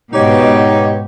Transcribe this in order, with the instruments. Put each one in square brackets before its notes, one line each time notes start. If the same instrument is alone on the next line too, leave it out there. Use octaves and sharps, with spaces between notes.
[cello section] G#2 B2 [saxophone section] D#4 G4 C#5